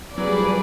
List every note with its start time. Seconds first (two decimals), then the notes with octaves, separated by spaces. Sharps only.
0.17 F#3 G#4 B4 D5
0.27 G3
0.38 F3